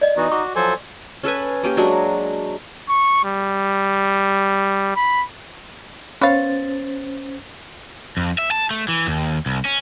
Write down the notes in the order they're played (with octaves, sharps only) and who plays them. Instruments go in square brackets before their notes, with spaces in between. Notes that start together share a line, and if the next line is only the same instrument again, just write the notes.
[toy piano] D5 D#5
[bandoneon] E3 B3 F#4 [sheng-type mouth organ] D#4
[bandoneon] F#4 [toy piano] C#6 D6
[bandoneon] F3 F#3 A4 [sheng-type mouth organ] C5 G#5
[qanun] C#4 A4 B4 G#5
A#3 C#4 G4
F#3 G#3 D4
[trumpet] C#6
G3
B5
[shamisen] B3 C#5 F5 [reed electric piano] C#4 C5 A6
[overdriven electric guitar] F2
E5
A5
A3
E3
D#2
C2
C#4